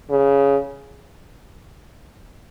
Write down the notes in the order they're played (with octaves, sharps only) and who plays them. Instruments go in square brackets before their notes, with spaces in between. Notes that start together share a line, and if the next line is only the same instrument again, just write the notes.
[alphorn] C#3